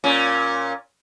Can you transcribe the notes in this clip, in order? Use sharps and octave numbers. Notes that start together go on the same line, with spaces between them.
A#2 C#4